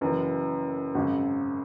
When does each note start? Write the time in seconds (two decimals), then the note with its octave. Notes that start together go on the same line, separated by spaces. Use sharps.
0.01 F#1 F#2 E3
0.95 G#1 F#2 C#3